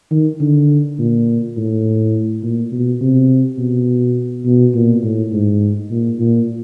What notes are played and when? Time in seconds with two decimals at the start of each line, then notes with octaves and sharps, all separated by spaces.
0.11 D#3
0.41 D3
0.99 A#2
1.57 A2
2.43 A#2
2.72 B2
3.01 C3
3.58 B2
4.46 B2
4.74 A#2
5.04 A2
5.33 G#2
5.91 A#2
6.19 A#2